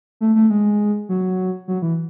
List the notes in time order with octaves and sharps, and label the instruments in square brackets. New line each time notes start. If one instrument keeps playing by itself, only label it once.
[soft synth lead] A3
A3
G#3
F#3
F#3
E3